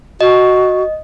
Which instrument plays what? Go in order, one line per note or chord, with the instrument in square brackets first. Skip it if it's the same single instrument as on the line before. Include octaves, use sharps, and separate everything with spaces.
[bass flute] F#4 [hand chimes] D#5